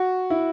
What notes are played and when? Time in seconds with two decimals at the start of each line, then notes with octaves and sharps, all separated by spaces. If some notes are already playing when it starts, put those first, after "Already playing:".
Already playing: F#4
0.30 E4